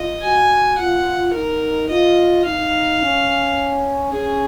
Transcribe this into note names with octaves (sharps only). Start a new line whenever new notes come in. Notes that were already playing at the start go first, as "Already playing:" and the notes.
Already playing: F4 D#5
F#4 G#5
F4 F#5
D#4 A#4
F4 D#5
D#4 F5
C#4
C#4 G#4